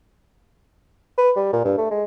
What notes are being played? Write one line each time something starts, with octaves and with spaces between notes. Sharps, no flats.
B4
G3
A#2
G2
A3
G#3